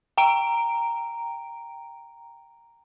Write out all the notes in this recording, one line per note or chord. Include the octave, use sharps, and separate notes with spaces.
G5 A#5 D7